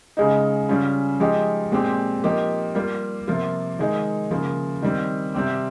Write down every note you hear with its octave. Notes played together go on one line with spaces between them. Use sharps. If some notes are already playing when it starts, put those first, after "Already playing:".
C#3 G#3 D#4
C#3 G3 C#4 F4
F3 G#3 D#4 G4
A#2 G#3 C4 G4
F3 A#3 D#4 G4
G3 A#3 F4
C3 F3 A#3 F4
D#3 G#3 D#4
C#3 F3 A#3
D#3 G3 C4
C3 G3 C4 G4